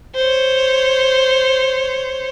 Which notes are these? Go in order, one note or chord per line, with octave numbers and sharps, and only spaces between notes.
C5 C#5